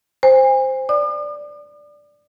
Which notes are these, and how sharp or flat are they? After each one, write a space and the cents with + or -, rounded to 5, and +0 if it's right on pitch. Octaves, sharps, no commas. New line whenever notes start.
C5 +0 G#5 -40
D5 +0 D6 +45